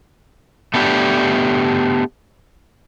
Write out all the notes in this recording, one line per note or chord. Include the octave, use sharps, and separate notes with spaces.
A3 B3 D4 G4